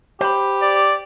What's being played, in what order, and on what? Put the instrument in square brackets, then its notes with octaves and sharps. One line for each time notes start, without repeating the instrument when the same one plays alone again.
[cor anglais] G4 [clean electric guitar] C5 B5
[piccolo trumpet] D5